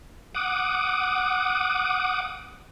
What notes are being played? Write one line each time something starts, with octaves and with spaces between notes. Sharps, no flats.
F#5 D6 D#6